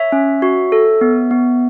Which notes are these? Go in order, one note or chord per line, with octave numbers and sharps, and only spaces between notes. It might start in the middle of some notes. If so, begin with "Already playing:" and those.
Already playing: C#5 E5
C#4
F#4
A4
B3
B3